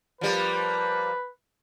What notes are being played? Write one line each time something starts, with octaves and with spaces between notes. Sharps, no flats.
F3 G3 A#3 B4